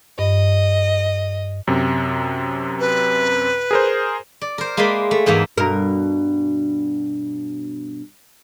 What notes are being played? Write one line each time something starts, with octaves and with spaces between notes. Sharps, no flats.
G2 D#5
F#2 C3
B4
G#4 A#4 C5
D5
A#4 C5
G#3 A#3 B4 D5 E5 C6
A3
E2 G#2 E3 A#3 E5 F5
G2 B2 A#4